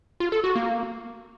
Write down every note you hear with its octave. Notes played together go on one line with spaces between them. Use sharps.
F4
A4
F#4
A#3